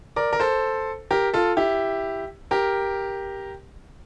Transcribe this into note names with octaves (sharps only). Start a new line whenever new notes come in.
A#4 D5
A#4
A4 C5
G4 A#4
F4 A4
E4 G4
G4 A#4